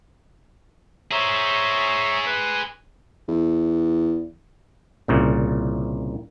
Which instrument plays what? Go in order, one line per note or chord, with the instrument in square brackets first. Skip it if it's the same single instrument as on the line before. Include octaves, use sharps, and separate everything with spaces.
[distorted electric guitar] G#4 C5 [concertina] C#5 E5 A#5
[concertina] B4
[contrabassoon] E2
[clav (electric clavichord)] C2 A#2 C#3